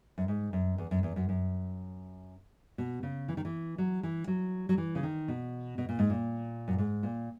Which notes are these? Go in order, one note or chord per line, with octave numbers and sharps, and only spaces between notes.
F#2
G#2
F#2
E2
F#2
E2
F#2
F#2
B2
C#3
E3
D#3
E3
F#3
E3
F#3
F#3
E3
C#3
D#3
B2
B2
A#2
G#2
A#2
F#2
G#2
A#2